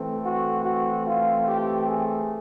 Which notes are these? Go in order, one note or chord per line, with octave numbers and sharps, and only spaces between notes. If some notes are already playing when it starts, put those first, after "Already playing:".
Already playing: E3 A3 C4
F#4
F#4
F4
G4
G#4